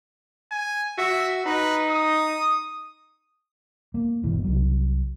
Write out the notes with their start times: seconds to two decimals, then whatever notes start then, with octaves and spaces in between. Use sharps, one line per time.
0.52 G#5
0.98 F#4 E5
1.46 D#4 B4
1.90 D#6
3.94 A#3
4.23 G1 B2 E3
4.44 C2 F#3